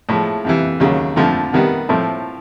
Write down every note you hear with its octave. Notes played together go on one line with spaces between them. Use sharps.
A2 F3 G#3
F2 C3 E3
D#2 C#3 F#3
F2 D3 F3 A3
C3 D#3 G3 B3
A2 F3 A3 C4